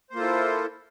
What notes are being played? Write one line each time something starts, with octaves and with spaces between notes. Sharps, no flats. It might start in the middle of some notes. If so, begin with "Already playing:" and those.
A#3 E4 F4 A4 C5